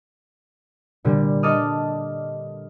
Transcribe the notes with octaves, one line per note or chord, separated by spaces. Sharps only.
A#2 D3 G3
A4 D#5 A5 D6 D#6 F6